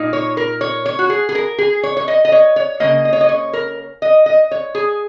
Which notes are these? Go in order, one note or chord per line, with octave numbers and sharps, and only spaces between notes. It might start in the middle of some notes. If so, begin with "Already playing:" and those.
Already playing: A#2 A#3 D#4
C#5
A#4
C#5
C#5
F#4
G#4
G#4
A#4
G#4
C#5
C#5
D#5
D#5
C#5
C#5
C#3 F#3 A#3 D#5
D#5
C#5
D#5
C#5
A#4
D#5
D#5
C#5
G#4